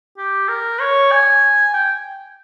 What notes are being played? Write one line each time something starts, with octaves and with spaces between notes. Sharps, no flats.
G4
A#4
C#5
G#5
G5